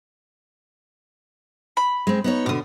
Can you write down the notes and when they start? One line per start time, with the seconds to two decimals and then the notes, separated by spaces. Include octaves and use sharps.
1.77 B5
2.07 G#3 C4
2.24 B3 D#4 C#5
2.46 B2 D3 D6 D#6